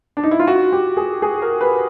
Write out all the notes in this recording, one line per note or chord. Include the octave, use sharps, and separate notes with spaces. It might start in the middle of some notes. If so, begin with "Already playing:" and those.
D4
D#4
E4
F4
F#4
G4
G#4
G#4
A#4
B4